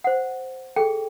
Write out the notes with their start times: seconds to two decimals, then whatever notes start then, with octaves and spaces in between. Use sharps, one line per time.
0.04 C5 F#5
0.76 G#4 A4 G5